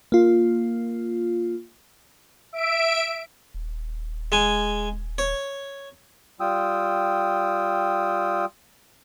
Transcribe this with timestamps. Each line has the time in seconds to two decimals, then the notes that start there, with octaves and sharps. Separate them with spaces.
0.12 A#3 F4
2.53 E5 D7
3.54 D#1
4.32 G#3 G#5
5.18 C#5
6.40 G3 F4 G5 D#6 E6